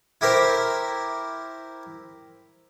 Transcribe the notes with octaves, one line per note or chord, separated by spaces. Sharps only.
E4 G4 A#4 C5